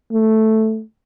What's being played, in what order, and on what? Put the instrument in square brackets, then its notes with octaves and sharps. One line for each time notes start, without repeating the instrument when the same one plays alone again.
[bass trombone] A3